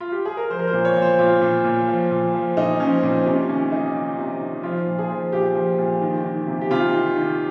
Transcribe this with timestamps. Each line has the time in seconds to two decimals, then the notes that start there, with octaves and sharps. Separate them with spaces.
0.00 F4
0.12 G4
0.25 G#4
0.37 A#4
0.50 F3 C5
0.59 A#4
0.67 C5
0.73 A#2
0.85 C#5
0.96 A#2
1.02 C5
1.19 A#2 F4
1.42 A#2
1.64 A#2
1.88 F3
2.11 A#2
2.34 F3
2.57 A#2 D#4
2.80 F3 C#4
3.03 A#2 C4
3.25 C3 C#4
3.49 D#3 C#4
3.71 D#3 D#4
3.94 D#3
4.18 C3
4.41 D#3
4.63 F3 F4
4.86 A#2
4.99 G#4
5.09 F3
5.32 A#2 G4
5.55 F3
5.78 A#2
6.02 D#3
6.24 D#3
6.47 C3
6.61 G4
6.70 C3 F4
6.93 D#3
7.16 D#3